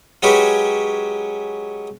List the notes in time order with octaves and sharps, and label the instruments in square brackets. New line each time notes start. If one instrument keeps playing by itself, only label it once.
[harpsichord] F#3 G#3 C#4 F#4 G4 B4